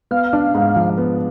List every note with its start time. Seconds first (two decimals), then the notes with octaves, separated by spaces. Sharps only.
0.11 B3 F5
0.33 D4
0.55 G#2
0.76 F3
0.98 B3